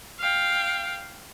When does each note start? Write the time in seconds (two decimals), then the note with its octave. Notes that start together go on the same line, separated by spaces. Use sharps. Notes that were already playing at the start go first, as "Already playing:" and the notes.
0.20 F5 G5